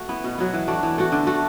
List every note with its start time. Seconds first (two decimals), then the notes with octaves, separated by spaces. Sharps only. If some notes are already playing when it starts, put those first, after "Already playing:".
Already playing: A3 F#4
0.09 B3 E4
0.24 B2
0.38 F#3 B3
0.54 E3
0.67 A3 D4 F#4
0.83 E3
0.98 A3 F#4
1.12 D3
1.27 A3 F#4